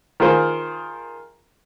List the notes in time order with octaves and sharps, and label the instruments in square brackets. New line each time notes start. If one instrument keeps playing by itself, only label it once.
[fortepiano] D#3 F4 G#4 A#4 C5